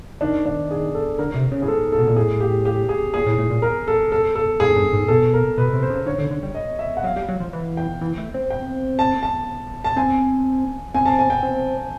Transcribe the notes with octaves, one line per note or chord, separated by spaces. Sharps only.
D#3 D4
D4
G#4
A4
D3 A#4
C3
C#3
A2 G#4
G#2 A4
A4
B2
A#2
A2 G#4
G4
G4
G#4
A#2 G#4
A2
A2
A#2
A#4
A4
A4
A4
G#2 G#4
G2
G#2
B2 A4
A#4
B2 B4
C3
C5
C#3
D3 C#5
D3
D3
G3
D#5
E5
F#5
F#3 F5
G3
F#3
F3
E3
G5
E3
A3
C4
G5
A5
A5
A5
C4 G#5
C4 G#5
A5
G#5
G5
C4